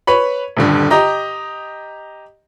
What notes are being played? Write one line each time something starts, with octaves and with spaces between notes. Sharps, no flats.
B4 C#5 B5
D#1 G2 D3
G4 D#5 A#5